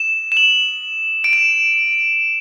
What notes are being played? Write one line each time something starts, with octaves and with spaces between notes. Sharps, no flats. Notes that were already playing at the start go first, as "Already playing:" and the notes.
Already playing: E7
E7
F#7
D7
E7